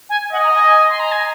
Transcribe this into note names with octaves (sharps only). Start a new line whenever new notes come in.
G#5
D#5 F#5
A#5
G#5
G#5
C6
A#5
G#5